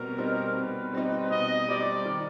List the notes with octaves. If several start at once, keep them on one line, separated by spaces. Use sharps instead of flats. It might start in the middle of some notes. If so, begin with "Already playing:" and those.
Already playing: B2 G3 C4 A#4
G3 C4 D#4
B2 B4
G3 C4 D#4
B2 D#5
G3 C4 D#4 D5
D#3